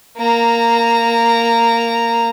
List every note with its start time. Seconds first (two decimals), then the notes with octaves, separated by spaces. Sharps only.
0.18 A#3 A#5